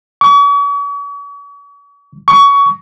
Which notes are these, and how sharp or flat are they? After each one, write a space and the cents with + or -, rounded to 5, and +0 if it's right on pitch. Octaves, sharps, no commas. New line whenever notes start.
C#6 +45
C#6 +25